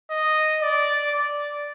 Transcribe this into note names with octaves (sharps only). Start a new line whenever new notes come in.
D#5
D5
D5